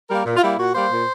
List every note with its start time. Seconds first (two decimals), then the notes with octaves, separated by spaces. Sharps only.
0.09 G3 A#3 A#4
0.25 A#2
0.36 F4
0.42 G3 A#3 E4
0.58 A#2 F#4
0.74 G3 A#3 C5
0.91 A#2